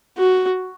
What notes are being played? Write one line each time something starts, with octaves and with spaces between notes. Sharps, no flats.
F#4